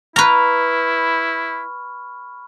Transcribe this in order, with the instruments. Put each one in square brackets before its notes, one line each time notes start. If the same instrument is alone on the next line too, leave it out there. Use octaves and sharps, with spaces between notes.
[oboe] E4 [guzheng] B4 A#5 [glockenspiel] B5 C#6 F6